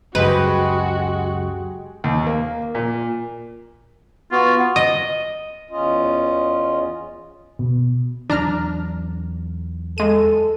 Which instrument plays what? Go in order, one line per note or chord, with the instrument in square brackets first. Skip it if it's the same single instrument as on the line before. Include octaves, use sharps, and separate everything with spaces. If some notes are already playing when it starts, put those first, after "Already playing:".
[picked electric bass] F#1 C#2 F#2 [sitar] G#3 G4 [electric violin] F#4 [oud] B4
[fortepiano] D#2
A#3
A#2
[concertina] B3 F#4 [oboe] F4
[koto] D#5
[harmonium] E2 C#4 F4 D#5
[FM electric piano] B2
[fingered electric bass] E2 E3 F#3 [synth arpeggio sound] D4 A#5 F6
[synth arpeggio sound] G#3 D#7 [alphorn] A4